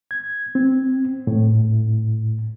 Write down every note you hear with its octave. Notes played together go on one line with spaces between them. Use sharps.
G#6
C4
A2